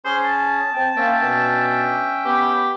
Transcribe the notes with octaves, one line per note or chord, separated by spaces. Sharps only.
C#4 G#4 C5
A5
C4 G5
A#3 C4 C#4 E5 G5
B2 B3 D4
B3 G4 B5